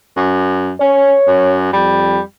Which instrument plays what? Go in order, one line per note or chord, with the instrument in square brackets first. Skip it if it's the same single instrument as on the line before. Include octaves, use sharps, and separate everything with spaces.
[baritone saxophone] F#2
[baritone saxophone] C#4 [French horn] C#5
[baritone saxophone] F#2
[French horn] F2 [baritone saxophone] G3